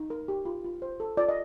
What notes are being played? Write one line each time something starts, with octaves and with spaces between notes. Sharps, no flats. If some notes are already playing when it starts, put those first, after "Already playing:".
Already playing: D#4
A#4
G4
F4
F4
C5
A4
F4 D5
D#5